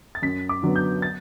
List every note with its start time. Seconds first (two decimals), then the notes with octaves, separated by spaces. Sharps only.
0.15 A6
0.22 F#2 B6
0.49 D6
0.63 D3 F#3 B3
0.76 G6
1.02 A6